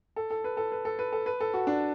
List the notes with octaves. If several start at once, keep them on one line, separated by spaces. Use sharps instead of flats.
A4
A4
B4
A4
B4
A4
B4
A4
B4
A4
F#4
D4